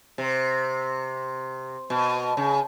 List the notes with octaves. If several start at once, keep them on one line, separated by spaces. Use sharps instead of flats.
C3
B2
C#3